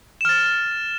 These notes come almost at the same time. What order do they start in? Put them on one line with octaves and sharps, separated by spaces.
E7 F6 A6